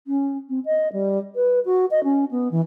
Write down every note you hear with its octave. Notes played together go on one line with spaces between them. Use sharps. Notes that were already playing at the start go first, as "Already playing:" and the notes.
C#4
C4
D#5
G3
B4
F#4
D#5
C#4
B3
E3